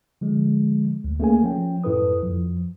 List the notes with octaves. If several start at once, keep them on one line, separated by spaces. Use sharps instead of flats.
D3 F3 G#3
D2
A3 A#3 C#4 G#4 A#4 G#5
F3 C#4 G5
F#2 A2 E4 A4 B4 D#6
F2 F3